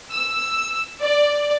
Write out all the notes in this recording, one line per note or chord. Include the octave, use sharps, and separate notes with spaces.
E6
D5